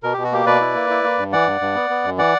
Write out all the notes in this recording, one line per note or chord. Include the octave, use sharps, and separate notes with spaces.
B2 A#4
B2 G4
F#4
A#3 G4
B2 B4 D5
E4
A#3
E4
A#3
G2
E3 D5 F#5
G2
G2
B3
B3
F#2
E3 D5 F#5